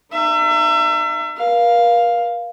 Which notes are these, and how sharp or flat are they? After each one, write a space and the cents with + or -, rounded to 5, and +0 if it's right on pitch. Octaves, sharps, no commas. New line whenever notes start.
D#4 -30 E5 +35
A#4 +40 F5 +0